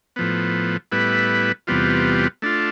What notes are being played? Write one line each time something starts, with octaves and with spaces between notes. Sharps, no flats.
A2 F3 B3
A2 G3 B3 E4 B4
E2 C3 G3 B3 F4
A3 D4 F4